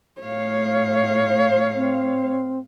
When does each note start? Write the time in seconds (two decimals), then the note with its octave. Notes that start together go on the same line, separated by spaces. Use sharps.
0.20 A2 C#5 F5
1.75 C4